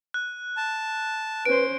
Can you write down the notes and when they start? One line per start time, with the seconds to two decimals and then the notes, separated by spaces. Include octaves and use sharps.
0.14 F#6
0.57 A5
1.45 C#4 B4 C5 D7